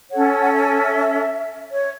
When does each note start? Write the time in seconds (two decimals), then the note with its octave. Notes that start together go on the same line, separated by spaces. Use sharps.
0.11 C#4 A4 C#5 F#5
0.40 F#5
0.51 E5
1.72 C#5